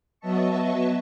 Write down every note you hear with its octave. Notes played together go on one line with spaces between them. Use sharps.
F#3 B3 D#5 E5 A5 C#6